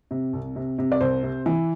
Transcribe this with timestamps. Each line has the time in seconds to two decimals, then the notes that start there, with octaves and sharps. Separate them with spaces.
0.11 C3
0.33 C2
0.56 C3
0.79 C3
0.92 D5
1.01 C2 C5
1.23 C3
1.46 E3